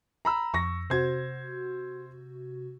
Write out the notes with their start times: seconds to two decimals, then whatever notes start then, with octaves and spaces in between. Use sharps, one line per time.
0.25 A#5 B5 E6
0.54 F2 C#6 A#6
0.90 C3 F#4 C5 G#6